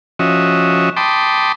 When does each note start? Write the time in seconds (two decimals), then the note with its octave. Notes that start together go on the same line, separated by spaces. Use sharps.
0.19 F3 C#4 F#4 D#5 E5
0.97 G5 A5 B5 C6 D6 D#6